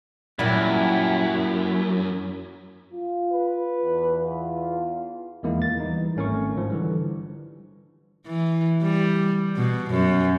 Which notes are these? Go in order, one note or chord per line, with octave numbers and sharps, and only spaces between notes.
F#2 A#2 F#3 G3 E4
F4
B4
E2
F4
E2 D#3 G#3 A#3 E4
D#2 A#3 A6
E3 G3 D#4
G#1 A3 C#4 A#4 C#5 C#6
G#2 F3
D3 E3 G3
E3
G3
B2
F#2